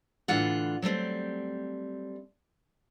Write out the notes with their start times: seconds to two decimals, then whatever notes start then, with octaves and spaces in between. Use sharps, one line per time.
0.28 A2 D3 E3 F4 F#5
0.82 F#3 G3 A3 C4